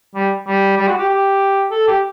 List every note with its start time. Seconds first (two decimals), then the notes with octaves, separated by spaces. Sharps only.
0.15 G3
0.47 G3
0.77 G3
0.88 F#4
0.98 G4
1.09 G4
1.71 A4
1.88 G4